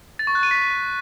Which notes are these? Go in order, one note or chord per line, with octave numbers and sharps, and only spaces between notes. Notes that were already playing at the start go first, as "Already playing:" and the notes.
A6
C#6
F#6
D#7
B6